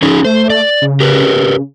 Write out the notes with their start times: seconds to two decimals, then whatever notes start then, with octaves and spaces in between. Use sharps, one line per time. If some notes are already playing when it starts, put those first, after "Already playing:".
0.02 C#3 C#4 D#4 G#4
0.25 A3 C5
0.50 D5
0.82 C#3
1.00 G4 A#4 B4